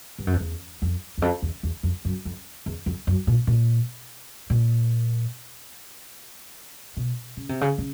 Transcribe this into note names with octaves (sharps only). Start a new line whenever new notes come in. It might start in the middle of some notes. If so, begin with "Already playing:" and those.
G2
F#2
F2
E2
F2
E2
F2
E2
E2
F2
F#2
F2
E2
F2
F#2
A#2
A#2
A#2
B2
C#3
C3
C#3
C#3